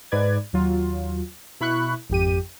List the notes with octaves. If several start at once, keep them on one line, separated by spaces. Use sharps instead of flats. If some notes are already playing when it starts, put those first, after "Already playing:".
G#2 B4 D5 G#6
D#2 F#3 F4
B2 E4 B5 C#6 F#6
G#1 F2 G4 D#7